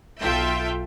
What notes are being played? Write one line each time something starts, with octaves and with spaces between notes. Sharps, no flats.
B1 F4 A4 E5 G5 G6